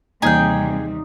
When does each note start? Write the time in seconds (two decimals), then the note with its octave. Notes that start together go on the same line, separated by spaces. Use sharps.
0.22 D#2 C3 E3 G3 A#3 D#4 G#4 G5